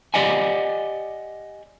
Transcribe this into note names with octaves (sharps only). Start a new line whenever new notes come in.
G4 D5 D#5 F#5 G#5